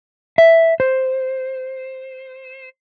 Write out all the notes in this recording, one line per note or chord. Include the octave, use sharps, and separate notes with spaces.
E5
C5